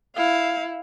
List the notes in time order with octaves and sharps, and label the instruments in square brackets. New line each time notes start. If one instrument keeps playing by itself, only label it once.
[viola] E4 [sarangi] F5